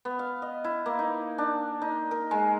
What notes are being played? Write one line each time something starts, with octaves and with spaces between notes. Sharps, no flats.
B3
F5
D#5
E4
A#3
D#4
D4
D#4
A#4
G#3